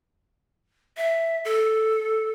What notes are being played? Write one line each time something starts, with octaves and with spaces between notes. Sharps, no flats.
E5
A4